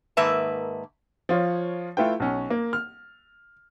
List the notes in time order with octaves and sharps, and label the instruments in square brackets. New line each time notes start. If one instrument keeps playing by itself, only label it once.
[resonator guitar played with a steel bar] G#2 D#3 A#3 B4 E5 A5
[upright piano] F3 F4 C#5
A3 E4 F4 B4 G5
B1 C#4
A#3
F6